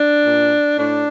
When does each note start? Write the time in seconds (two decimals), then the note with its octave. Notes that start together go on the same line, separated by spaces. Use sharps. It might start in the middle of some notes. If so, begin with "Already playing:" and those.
Already playing: D4
0.24 A#2
0.77 A2 D4